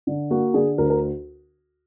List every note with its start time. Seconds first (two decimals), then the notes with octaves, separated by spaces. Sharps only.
0.07 D3
0.30 A#3 F#4
0.54 D3 G#4
0.78 D2 A#4
0.90 A#4